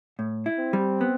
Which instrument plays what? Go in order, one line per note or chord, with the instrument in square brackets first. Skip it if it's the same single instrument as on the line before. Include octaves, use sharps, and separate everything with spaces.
[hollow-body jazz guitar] A2
E4
[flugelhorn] C4
[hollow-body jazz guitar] G3
B3